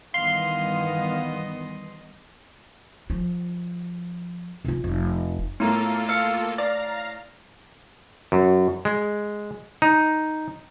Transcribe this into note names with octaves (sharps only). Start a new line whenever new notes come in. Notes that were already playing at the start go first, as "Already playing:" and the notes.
G2 D#3 E3 B3 D#5 F5 C6
F3
C3 F4
F1
A2 A#3 B3 F4 A4 A#5
F5 E6 C#7
D5 F5 A#5 A6
F#2
G#3
D#4